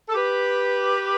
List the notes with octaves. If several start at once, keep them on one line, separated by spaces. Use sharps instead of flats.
A4
G4 B4